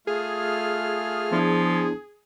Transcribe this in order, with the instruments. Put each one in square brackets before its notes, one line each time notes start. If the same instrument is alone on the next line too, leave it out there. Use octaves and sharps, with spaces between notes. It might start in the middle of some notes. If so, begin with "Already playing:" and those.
[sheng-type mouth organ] A3 F4 F6 [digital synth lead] G#4
[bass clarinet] F3 [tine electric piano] B3 D4 E4